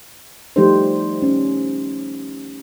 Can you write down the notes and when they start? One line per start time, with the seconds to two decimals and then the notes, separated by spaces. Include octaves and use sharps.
0.56 F3 G3 A3 D#4 G4 C5
1.22 C#4